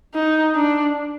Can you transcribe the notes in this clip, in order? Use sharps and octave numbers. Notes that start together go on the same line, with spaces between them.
D#4
D4